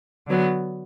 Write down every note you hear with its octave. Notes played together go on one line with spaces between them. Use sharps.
D3 F#3 B3